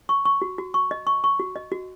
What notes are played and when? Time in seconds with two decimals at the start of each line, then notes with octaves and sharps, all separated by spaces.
0.09 C#6
0.25 C#6
0.42 F#4
0.58 F#4
0.74 C#6
0.91 D#5
1.07 C#6
1.24 C#6
1.40 F#4
1.56 D#5
1.72 F#4